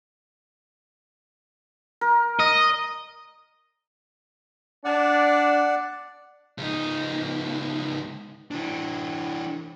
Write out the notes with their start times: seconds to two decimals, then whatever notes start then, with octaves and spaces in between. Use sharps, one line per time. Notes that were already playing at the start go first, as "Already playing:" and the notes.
2.01 A#4
2.39 D#5
4.85 D4 D5 F#5
6.58 C#2 D#4
8.51 E3 D4